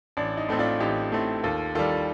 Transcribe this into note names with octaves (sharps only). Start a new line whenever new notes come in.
A1 D4
D#4
A2 A3 C4
D4 F4
A1 D#4 G4
A2 A3 C4
D#2 F4 A4
D#3 G3 F4 A4